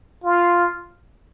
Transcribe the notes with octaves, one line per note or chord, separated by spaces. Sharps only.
F4